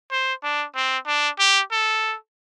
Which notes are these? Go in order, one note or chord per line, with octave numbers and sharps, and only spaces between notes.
C5
D4
C4
D4
G4
A4